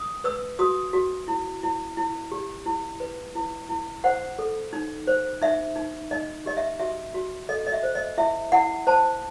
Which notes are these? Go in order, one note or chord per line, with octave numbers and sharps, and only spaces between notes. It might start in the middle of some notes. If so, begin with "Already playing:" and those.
Already playing: D#6
B4 E6
F#4 D#6
F#4
E4
E4
E4
G4
E4
B4
E4
E4
C5 F#5
A4
D#4
C5
D#4 E5
D#4
D#4 D#5
G4 D#5
E5
F#4 E5
F#4
A4 D#5
D#5
E5
C5
D#5
E4 E5
E4 F#5
C5 A5